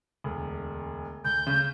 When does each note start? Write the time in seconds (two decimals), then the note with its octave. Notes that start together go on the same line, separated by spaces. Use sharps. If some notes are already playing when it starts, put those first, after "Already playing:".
0.24 E1 D2
1.25 D2 G6
1.47 C#3